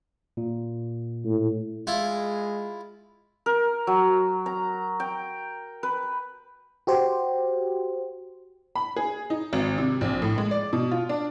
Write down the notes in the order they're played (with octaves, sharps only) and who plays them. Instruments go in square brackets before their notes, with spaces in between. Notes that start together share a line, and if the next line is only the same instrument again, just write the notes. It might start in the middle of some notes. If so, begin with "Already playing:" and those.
[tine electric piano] A#2
[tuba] A2
[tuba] G#3 [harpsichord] E4 F4
[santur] A#4
F#3
A#5
G5
B4
[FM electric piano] F#4 G4 C5
[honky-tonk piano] B5
G#4
D#4
G#1
C3
A#1
A2
G#3
D5
B2
F4
D4